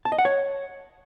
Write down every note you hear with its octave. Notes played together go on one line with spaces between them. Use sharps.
A5
D#5
F#5
C#5